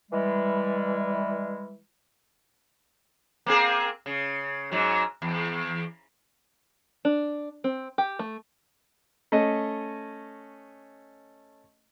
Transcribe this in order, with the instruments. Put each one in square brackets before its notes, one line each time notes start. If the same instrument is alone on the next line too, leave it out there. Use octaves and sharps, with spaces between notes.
[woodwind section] E3 G3 G#3
[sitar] A#3 C4 G#4
C#3
G#2 F#3
E2
[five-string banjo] D4
C4
G4
A3
[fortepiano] A3 C#4 D#5